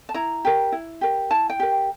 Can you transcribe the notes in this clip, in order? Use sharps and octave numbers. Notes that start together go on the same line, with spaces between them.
A5
E4 A#5
G4 A#4
E4
G4 A#4
E4 A5
G5
G4 A#4